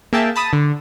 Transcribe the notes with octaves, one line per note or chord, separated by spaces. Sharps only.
A#3 G#4 E5 G5 A5
A5 B5 D#6
D3